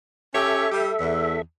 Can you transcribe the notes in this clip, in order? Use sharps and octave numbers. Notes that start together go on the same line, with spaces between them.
C#4 G4 A4 C#5 E5
G3 G4
E2